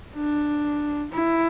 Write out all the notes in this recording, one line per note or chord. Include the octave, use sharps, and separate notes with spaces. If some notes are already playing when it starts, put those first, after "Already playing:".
D4
E4